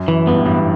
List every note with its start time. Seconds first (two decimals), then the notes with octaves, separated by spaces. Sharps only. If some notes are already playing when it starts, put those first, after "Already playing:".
Already playing: F#2
0.08 E3
0.27 G2 B3
0.36 A2
0.45 G2 E3